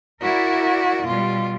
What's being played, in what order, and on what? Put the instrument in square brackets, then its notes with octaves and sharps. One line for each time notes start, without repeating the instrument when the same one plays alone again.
[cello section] E4 A#4 D5 [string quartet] F#4
[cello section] B2 G3 [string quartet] F4